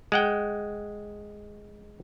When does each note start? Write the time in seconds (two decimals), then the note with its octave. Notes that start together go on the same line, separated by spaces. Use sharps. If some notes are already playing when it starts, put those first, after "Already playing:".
0.12 G#3 F#5 G5